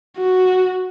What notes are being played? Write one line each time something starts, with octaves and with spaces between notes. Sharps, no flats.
F#4